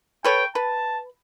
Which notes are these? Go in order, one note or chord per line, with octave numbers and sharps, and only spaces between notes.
A4 B4 C#5 G5
B4 A5